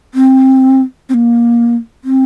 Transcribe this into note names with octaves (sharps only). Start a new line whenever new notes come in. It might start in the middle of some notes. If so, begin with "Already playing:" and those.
C4
C4
A#3
C4